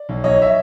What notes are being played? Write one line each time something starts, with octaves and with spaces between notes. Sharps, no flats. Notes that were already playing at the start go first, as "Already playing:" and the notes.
Already playing: D5
B1
B1 C#5 D#5
E5